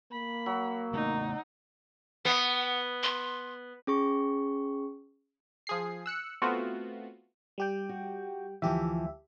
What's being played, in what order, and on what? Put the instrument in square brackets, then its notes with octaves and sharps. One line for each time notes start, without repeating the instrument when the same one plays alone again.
[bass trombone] A#3 [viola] B5
[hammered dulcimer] F#3
[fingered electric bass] C#3 A3 B3 [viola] D#4
[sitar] B3 [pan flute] F#5
[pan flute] C6
[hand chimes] C#4 G#4 C#6
[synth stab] F3 G#4 C7
E6 F#6 C#7
A3 B3 C4 F4 F#4
[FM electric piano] G3 G4 G5
[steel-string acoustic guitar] F#4
[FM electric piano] D2 G4 E5 [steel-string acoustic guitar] E3 F3